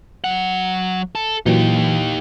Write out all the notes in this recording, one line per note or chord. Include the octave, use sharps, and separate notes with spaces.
F#3 F#5
A4
A#2 E3 F#3 D#4 G4